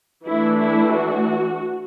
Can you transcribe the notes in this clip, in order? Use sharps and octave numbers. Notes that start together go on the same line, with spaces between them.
E3 A3 D4 E4
E4
F#4